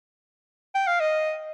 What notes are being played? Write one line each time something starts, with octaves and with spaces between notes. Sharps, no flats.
G5
F5
D#5